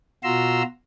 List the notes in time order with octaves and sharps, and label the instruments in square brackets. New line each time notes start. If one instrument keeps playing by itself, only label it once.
[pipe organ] B2 F4 F#4 A#5 C6 E6